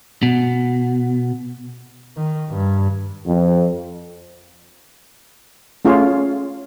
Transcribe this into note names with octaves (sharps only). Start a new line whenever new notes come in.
B2
D#3
G2
F2
A3 C#4 F4 G#4 C#5 F5